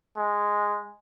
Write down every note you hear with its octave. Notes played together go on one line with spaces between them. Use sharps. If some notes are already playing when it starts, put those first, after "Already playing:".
G#3